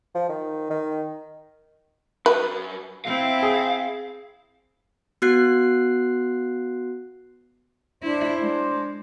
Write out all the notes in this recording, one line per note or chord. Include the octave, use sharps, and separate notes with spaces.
F3
D#3
D#3
F#2 B4
C4 E4 F5
G#4
B3 F#4 F#6 C7
D4 E4 C5
G#3 D4